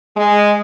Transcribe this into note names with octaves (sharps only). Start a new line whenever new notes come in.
G#3